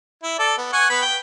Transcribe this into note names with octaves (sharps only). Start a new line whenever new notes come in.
E4
A4 D5
B3
F#5 G#5 C#6
B3 B5
G5